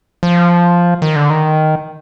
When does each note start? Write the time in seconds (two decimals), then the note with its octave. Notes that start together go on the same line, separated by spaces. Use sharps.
0.23 F3
1.02 D#3
1.16 D3
1.30 D#3